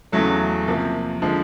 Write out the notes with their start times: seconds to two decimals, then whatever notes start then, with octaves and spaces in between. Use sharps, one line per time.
0.12 E2 C#3 F#3 A3
0.67 C3 F3 A#3
1.22 D3 F3 G#3